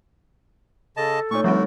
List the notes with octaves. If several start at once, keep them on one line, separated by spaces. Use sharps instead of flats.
C#3 A4 D#5 A5
A#2 A3 D#4 C#5 C#6
D3 F3 G3 C4 F#4